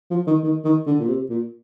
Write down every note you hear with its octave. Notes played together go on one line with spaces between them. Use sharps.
F3
D#3
D#3
D#3
D3
A#2
C3
A#2